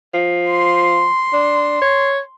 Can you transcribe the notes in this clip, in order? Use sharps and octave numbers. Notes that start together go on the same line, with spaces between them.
F3
C6
D4
C#5